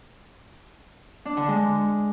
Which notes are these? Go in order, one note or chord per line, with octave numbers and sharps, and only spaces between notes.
D4
D3
G#3